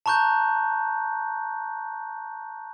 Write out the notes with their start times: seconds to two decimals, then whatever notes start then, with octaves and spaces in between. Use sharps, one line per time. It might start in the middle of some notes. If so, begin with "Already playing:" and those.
0.06 A5 A#5 C#6 F#6 G6